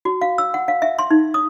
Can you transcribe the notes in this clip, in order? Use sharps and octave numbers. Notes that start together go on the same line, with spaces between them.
F#4
F5
E6
F#5
F5
E5
C6
D#4
D#6